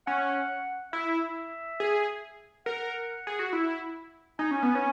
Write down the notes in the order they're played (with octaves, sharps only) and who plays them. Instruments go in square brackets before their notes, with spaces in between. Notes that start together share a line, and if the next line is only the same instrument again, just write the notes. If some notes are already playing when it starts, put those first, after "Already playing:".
[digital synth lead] C#4 [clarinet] F#5
[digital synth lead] E4 [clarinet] E5
[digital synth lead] G#4
[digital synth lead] A#4 [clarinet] F#5
[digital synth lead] G#4
F#4
E4
[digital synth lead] D#4 [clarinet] G#5
[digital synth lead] C#4
B3
C#4